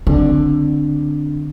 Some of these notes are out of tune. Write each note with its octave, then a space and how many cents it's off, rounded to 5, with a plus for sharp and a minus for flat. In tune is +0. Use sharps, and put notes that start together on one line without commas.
D3 +10 C4 +0